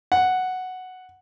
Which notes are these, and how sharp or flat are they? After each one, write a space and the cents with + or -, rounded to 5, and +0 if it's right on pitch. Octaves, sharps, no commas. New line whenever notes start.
F#5 +0